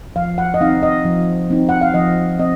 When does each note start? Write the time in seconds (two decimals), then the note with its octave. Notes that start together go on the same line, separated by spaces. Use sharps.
0.16 F3 F5
0.38 F#5
0.54 D#5
0.61 C4 D#4 F5
0.83 D#5
1.05 F3
1.50 C4 D#4
1.69 F#5
1.81 F5
1.94 F3 D#5
2.39 C4 D#5